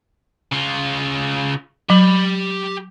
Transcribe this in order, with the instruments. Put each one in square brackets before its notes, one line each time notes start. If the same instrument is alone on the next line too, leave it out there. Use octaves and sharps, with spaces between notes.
[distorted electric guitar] C#3 F4
[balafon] F#3 [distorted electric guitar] G4 B5